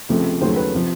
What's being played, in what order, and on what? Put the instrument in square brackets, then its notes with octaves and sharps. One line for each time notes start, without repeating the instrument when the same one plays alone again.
[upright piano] C#2 C3 F3 A3
D#2 C#3 F#3 A3 C5
B4
C3 F3